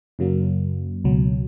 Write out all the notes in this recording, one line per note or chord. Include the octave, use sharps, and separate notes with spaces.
F#2 C#3 F#3 A#3
C#2 B2 F#3